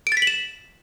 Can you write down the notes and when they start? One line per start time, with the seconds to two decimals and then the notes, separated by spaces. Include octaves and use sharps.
0.07 D7
0.12 A6
0.17 B6
0.22 F#7
0.27 E7